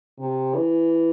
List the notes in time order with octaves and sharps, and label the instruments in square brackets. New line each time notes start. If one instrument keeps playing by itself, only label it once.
[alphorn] C3
E3